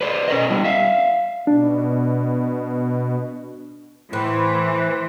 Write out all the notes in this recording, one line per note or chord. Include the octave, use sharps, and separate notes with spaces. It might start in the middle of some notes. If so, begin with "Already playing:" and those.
B4 C5 D5
C#4 A#4 D#5
G3 B3 D4 E4
E5 F5
B2 D4
A2 E3 B4 C5